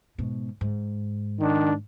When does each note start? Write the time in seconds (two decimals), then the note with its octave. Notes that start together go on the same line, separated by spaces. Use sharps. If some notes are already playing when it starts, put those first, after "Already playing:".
0.18 G#2 B2
0.61 G#2
1.40 D#3 D4